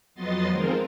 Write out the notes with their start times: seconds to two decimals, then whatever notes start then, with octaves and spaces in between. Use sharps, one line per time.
0.15 F2 F#3 B3 D#5 C6 A6
0.49 D#3 F3 G#3 C4 F4 A#4